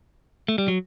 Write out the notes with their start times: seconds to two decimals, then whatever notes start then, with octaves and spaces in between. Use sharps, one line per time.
0.48 A3
0.58 G3
0.68 F#3